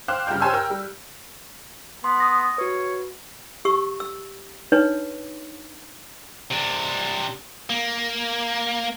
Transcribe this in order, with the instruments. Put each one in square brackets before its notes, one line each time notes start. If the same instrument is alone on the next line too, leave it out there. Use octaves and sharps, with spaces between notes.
[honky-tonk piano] C5 F5 G5 D6 F#6
G2 C#3 F4 G5 F6 G6
G4 C5 C#5 G#5 C6 E6
A#4 G5 E6
G3
[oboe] B3 [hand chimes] C6
[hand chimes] D#6 A#6
[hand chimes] F#4 B4 [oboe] C#5
[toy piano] G4 C#6 E6
E6
D4 D#4 B4 C#5
[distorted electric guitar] C3 D4
A#3